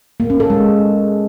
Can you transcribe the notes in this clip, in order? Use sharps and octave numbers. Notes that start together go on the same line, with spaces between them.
A#3
C#4
A4
G#3